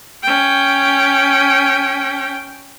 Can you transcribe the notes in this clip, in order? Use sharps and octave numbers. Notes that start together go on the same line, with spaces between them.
C#4 G5